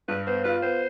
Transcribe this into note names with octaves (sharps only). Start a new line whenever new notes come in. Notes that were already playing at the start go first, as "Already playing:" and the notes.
G2 B4
B3 C5
F4 B4
B3 C5